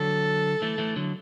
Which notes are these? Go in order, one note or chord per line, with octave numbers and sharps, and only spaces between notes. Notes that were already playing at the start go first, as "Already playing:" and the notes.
Already playing: D3 F#3 A4
E3 A3
E3 A3
D3 F#3